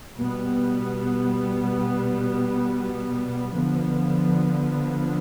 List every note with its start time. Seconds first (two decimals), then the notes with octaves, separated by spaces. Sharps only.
0.18 B2 G3 B3
3.52 D3 F3 B3